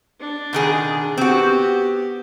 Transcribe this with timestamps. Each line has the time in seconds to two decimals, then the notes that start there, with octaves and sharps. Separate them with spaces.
0.20 D4
0.53 B2 D#3 G#4
1.18 B3 C4 F#4 G4